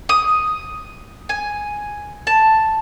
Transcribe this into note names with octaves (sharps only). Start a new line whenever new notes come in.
D#6
G#5
A5